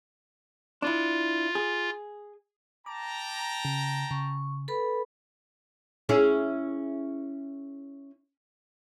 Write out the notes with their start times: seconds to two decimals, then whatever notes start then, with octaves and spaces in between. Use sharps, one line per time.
0.82 D4 E4 F4
1.55 G#4
2.86 G5 A5 A#5 D6
3.65 C#3
4.11 C#3 C#6
4.68 A4 B4 B5
6.09 C#4 E4 G#4